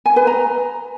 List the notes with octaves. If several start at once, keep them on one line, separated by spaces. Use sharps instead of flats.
G#5
B4
A#5